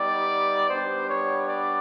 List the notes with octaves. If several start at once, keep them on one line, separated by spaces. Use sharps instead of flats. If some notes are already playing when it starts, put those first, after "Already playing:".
Already playing: G3 B3 D#4 G4 D5
G3 B3 D4 G4 C5
C#5
D5